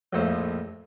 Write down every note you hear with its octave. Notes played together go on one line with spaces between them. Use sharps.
A#1 F2 A2 C5 C#6